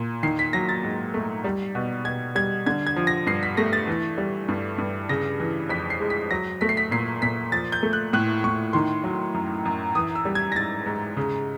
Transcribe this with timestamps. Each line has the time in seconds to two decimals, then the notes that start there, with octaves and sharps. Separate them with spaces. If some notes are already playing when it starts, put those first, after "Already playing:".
Already playing: A#2
0.23 D#3 C7
0.39 B6
0.53 F#3 A#6
0.69 A6
0.83 G#2
1.14 A3
1.44 G3
1.75 B2
2.05 B2 G#6
2.35 G3 G#6
2.66 D3 G#6
2.87 G#6
2.96 F3
3.07 A#6
3.27 G2 C7
3.43 B6
3.57 A3 A#6
3.73 A6
3.87 E3
4.18 G3
4.48 G2
4.78 G2
5.09 C#3 A#6
5.40 E3
5.69 F2 B6
5.90 C7
6.00 G#3
6.10 B6
6.31 F#3 A#6
6.61 A3 B6
6.69 C7
6.77 B6
6.91 A#2 C7
7.22 A#2 B6
7.52 F3 A6
7.72 G6
7.83 A3
7.93 F#6
8.13 A2 F#6
8.44 A2 C#6
8.73 D#3 C6
9.04 F#3
9.34 F#2
9.65 F#2
9.95 E3 D#6
10.15 E6
10.25 G3
10.35 G#6
10.52 A#6
10.56 G#2 A6
10.86 G#2
11.17 C#3